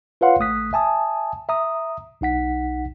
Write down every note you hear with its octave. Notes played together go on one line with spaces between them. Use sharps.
F4 B4 C#5 F5 F#5 C6
G#1 A3 D#6 F#6 B6
E5 G#5 A5 D#6
E5 A#5 D#6
B1 D#4 F#5 B6